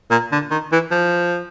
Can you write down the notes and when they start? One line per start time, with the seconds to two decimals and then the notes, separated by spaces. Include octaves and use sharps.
0.11 A#2
0.32 D3
0.51 D#3
0.72 E3
0.91 F3